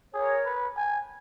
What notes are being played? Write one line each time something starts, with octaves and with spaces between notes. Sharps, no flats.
G#4 A#4 C#5
B4
G#5